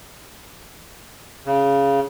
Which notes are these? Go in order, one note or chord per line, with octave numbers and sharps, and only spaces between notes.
C#3